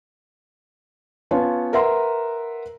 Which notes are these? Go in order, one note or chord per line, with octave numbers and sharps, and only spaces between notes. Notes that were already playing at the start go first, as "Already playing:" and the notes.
B3 C#4 F4 C#5 A5
A#4 B4 E5 F#5 A#5 C6